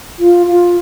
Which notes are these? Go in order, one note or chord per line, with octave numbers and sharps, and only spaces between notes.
F4
F4